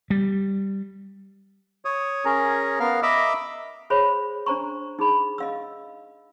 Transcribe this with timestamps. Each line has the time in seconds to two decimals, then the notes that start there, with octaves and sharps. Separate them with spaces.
0.10 G3
1.85 C#5 D#6
2.25 C#4 G#4 A#4 A#5
2.80 B3 A#4 F5 F6
3.03 D#5 E5 A#5 B5 D6 E6
3.90 G#4 C5 C#5 E5 B5
4.46 D4 C5 A#5 C#6
4.99 D#4 G#4 B5
5.38 D#5 F5 E6